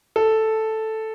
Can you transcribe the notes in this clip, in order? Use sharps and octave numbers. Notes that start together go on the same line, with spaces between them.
A4